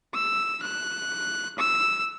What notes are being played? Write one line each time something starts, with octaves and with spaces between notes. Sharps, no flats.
E6
F#6
E6